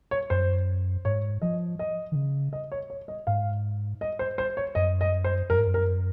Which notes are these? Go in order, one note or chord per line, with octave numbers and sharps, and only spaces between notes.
C#5
F#2 C5
G#2 C#5
F3 D#5
D#5
D#3
C#3
D#5
C#5
C#5
D#5
G#2 F5
D#5
C5
C5
C#5
F#2 D#5
D#5
C5
F#2 A#4
G#2
F#2
A#4